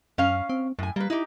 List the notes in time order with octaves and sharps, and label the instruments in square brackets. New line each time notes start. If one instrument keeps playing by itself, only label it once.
[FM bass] F#2 [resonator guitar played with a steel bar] C#4 F5
[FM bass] C4
[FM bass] F#2 [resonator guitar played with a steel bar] A2 G#5
[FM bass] G3 [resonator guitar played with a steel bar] A#3 B4
[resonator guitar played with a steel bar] D#4 G4 [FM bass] E4